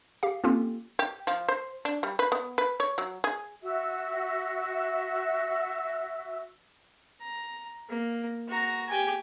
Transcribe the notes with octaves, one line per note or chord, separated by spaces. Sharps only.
G4 F5
A#3 C4 C#4 F4 G4 A4
G4
F3
C5
D4
G3
B4
B3
B4
C#5
F#3
G#4
F#4 E5 E6
A#5
A#3
F#4 A#5
G4 G#5